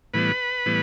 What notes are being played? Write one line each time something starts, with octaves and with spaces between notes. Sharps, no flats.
A2 E3 G3 B3 B4 B5
A2 E3 G3 B3